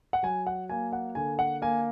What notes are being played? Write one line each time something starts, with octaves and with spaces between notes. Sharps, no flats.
F#5
F#3 G#5
F#5
A#3 G#5
F#5
D3 G#5
F#5
A#3 G#5